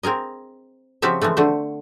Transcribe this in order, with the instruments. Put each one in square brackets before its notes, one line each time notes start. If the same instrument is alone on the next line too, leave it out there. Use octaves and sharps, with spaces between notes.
[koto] C4 G#4 A#4 D#5
C#3 F3 C4 F#4 G4 E5
E3 F3 G#3 A3
D3 A3 F#4 C5